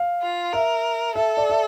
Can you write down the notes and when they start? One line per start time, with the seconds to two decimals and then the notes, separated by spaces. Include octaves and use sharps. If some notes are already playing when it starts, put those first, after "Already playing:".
Already playing: F5
0.22 F4
0.53 A#4 E5
1.16 A4 E5
1.37 D5
1.50 E5